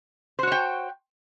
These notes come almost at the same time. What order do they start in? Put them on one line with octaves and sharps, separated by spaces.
C5 F#4 C#5 G5